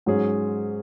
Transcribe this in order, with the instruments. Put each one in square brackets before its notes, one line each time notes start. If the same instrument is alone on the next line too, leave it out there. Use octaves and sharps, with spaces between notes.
[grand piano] G#2 F#3 C#4 G#4